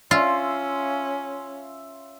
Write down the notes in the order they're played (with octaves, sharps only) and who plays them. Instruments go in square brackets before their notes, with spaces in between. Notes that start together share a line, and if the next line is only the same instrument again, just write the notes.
[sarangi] C#4 [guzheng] F4 [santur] E5 F5 C6